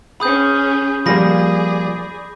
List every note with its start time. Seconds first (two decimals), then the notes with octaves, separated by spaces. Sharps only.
0.20 C#4 G#4 B5 D#6 G6
1.06 F3 G3 A#3 G#4 D5 B5 A#6